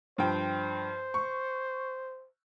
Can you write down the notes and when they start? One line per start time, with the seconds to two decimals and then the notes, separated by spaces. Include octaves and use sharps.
0.18 G2 F3 C5 G5
1.14 C#6